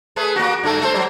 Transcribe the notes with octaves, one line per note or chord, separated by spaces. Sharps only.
A3 G#4 B4
A#3 F#4
G2 A3 A4
A3 A4 C5
F#3 G3